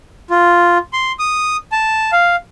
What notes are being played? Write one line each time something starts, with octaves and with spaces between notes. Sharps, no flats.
F4
C6
D#6
A5
F5